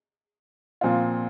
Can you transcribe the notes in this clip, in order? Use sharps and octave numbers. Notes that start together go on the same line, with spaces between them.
A#2 F3 C4 F4